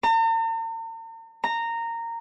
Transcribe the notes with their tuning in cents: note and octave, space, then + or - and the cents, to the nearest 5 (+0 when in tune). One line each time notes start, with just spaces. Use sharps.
A#5 -45
A#5 -15